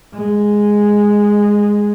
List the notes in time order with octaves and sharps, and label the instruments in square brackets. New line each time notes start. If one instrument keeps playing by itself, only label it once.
[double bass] G#3